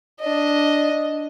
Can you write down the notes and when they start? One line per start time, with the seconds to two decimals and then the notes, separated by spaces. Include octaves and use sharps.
0.21 D4 D#5